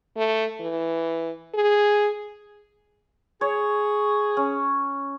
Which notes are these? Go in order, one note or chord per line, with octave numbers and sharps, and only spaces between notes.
A3
E3
G#4
G#4 C#5
C#4